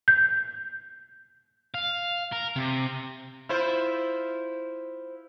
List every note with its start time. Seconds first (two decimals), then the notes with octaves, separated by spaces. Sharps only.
0.08 G6
1.74 F5
2.32 A#4
2.56 C3
3.49 E4 F4 C5